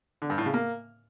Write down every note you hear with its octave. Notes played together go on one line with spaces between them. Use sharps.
D3
G2
A2
C#3
A#3